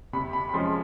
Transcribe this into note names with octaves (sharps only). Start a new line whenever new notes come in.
C3 B5
B5
B5
F3 G#3 C#4 C6